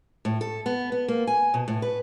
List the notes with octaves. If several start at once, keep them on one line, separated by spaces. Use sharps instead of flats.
A2
A4
B3
B3
A#3
G#5
B2
A2
B4